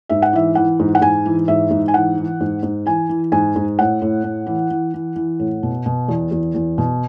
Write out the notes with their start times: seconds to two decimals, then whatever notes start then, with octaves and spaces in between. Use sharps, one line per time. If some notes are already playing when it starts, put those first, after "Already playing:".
0.09 G#2 E5
0.22 F#5
0.33 E3 E5
0.55 E3 F#5
0.79 G#2
0.95 F#5
1.01 G#2 G#5
1.26 E3
1.48 G#2 E5
1.70 G#2
1.88 G#5
1.94 E3 F#5
2.18 E3
2.40 G#2
2.63 G#2
2.86 E3 G#5
3.09 E3
3.32 G#2 G#5
3.56 G#2
3.78 A2 F#5
4.02 A2
4.24 A2
4.47 E3
4.70 E3
4.94 E3
5.16 E3
5.39 A2
5.63 B2
5.86 B2
6.08 E2
6.31 E2
6.55 E2
6.78 B2